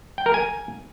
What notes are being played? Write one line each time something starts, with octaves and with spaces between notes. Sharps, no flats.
G5
A#4
G#5